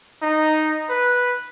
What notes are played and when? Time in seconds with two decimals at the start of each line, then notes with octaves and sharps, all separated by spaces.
0.22 D#4
0.89 B4